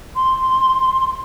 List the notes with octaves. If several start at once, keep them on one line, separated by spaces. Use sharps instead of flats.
C6